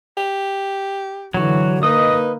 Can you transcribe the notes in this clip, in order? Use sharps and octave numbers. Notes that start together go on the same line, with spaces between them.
G4
D3 E3 F#3 F#4
A#3 D#4 B4 D#5 D#6